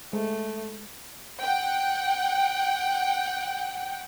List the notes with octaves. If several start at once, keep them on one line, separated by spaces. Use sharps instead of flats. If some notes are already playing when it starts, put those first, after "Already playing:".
G#3 A3
F#5 G5